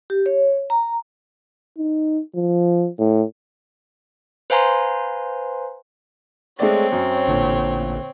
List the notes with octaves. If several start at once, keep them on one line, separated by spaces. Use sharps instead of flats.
G4
C#5
A#5
D#4
F3
A2
B4 C5 F5 G#5 A#5 C6
G#3 A3 C4 C#5 D5
F#2
A1 A#2 D3